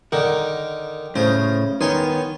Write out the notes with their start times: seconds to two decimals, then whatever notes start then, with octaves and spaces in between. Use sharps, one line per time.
0.12 D3 D#3 A#4 F#5
1.15 A2 C#3 C5 D#6
1.81 D#3 B3 C#5 G#5 C6